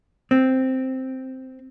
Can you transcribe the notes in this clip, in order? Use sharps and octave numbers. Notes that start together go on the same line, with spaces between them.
C4